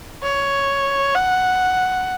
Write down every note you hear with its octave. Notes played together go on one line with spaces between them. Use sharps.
C#5
F#5